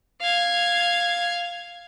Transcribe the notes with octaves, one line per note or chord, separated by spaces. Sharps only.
F5 G#6